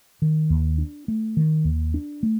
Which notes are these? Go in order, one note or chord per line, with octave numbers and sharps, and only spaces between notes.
D#3
D#2
D4
A3
D#3
D#2
D4
A3